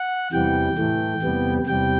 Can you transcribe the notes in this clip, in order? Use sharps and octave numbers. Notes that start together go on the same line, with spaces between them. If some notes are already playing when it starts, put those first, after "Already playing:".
Already playing: F#5
E2 C3 E3 G3 G5
A2 E3 A3
E2 C3 G3 B3
E2 C3 G3 G5